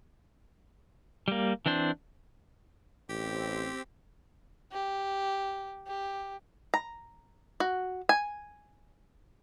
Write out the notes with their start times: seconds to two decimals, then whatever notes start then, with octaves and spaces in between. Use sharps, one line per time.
1.28 G3 A#3
1.66 E3 C4 D4 C5
3.09 A1 C4 G4
4.72 G4
5.87 G4
6.74 A#5
7.60 F#4
8.09 G#5